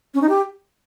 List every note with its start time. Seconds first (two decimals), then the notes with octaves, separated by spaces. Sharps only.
0.14 C#4
0.22 D#4
0.29 G4